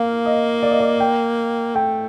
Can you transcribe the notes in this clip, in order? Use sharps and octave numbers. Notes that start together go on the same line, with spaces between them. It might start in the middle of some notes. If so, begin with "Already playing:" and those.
Already playing: A#3 F5
D#5
D5
D#5
D5
G5
A3 G5